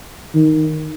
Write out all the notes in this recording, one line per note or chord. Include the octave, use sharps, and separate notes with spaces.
D#3